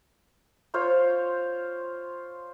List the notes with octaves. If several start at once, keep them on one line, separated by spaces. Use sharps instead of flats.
F4 C5 C#5 F5